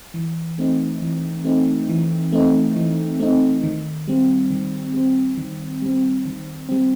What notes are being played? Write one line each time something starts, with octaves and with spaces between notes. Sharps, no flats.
E3
A3 C4 D#4
E3
A3 C4 D#4
E3
A3 C4 D#4
E3
A3 C4 D#4
D#3
G3 C4
D#3
G3 C4
D#3
G3 C4
D#3
G3 C4